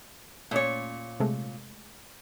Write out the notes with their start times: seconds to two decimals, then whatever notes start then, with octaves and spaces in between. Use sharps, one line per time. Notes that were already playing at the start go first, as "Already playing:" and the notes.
0.51 A#2 A3 C#4 C#5
1.20 C3 G#3 A3